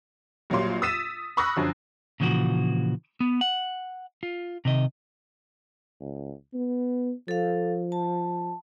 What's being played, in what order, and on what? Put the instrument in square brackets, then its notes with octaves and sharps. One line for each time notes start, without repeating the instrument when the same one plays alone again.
[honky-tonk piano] A#1 F#3 G3 A#3 C6
D#6 E6 A6 B6 D#7 E7
B5 C#6 D#6 E6 F#6 A#6
F#2 D3 F3
[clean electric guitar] A#2 C#3 E3 F3 F#4
B3
F#5
F4
C3 D#3 D#5
[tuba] C#2
B3
[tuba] F3 [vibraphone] A4 F5
[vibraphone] A5